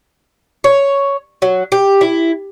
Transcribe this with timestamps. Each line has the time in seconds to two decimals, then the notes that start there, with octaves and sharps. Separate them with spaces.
0.64 C#5
1.42 F#3
1.72 G4
2.01 E4